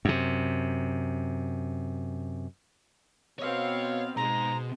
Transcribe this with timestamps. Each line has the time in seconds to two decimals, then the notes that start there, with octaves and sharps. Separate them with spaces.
0.05 F#2 C3
3.39 B2 B3 C4 C#5 F5
4.17 G#2 B2 G#3 C5 A#5